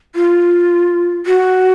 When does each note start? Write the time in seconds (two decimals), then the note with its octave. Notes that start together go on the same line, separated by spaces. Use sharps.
0.15 F4
1.26 F#4